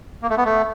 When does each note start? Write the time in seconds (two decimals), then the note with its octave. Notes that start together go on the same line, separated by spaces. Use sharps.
0.22 A#3
0.30 A3
0.38 B3
0.45 A3